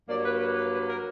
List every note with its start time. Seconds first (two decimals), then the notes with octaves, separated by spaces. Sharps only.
0.09 G2 F#3 A#3 D5
0.25 B4
0.40 B4
0.57 B4
0.73 B4
0.89 A#4